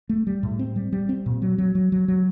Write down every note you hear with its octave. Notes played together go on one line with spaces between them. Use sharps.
A3
G3
A2
C4
G3
G3
C4
A#2
F#3
F#3
F#3
F#3
F#3